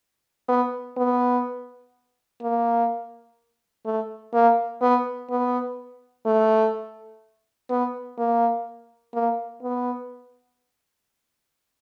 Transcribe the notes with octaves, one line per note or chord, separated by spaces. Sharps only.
B3
B3
A#3
A3
A#3
B3
B3
A3
B3
A#3
A#3
B3